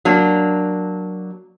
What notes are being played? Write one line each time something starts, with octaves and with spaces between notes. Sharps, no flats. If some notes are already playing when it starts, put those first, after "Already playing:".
F#3 A#3 D4